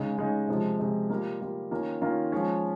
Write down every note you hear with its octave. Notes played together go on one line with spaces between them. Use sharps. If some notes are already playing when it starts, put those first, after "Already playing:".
Already playing: C#3 G#3 D#4
C#3 G#3 D#4
C3 F3 G#3
C3 F3 G#3
G3 A#3 F4
G3 A#3 F4
D#3 A#3 C#4 F4
D#3 A#3 C#4 F4
F3 G#3 C#4 F4